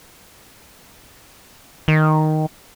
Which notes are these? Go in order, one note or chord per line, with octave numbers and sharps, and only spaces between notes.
D#3